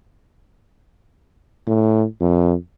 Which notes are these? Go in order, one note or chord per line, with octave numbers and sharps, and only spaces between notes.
A2
F2